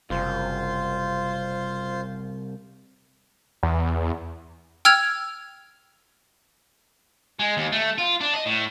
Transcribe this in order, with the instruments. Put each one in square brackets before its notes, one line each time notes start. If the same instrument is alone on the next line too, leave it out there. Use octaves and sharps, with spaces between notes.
[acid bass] F#1 [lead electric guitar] C2 [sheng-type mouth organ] F4 C5
[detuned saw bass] E2
[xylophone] G5 E6 F6 G#6 F7
[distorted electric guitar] G#3
D#2
A3
F4
D4
D#5
A2